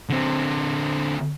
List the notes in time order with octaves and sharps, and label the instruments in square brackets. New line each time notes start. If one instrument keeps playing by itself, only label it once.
[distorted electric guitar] D3 C4